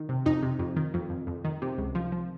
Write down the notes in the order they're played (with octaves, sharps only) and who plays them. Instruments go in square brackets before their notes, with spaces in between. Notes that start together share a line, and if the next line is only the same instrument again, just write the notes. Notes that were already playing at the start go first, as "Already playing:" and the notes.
Already playing: [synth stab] D#3
C3
F2 D#4
C3
F2
D#3
F2
F2
F2
D#3
C3
C#2
F3
F3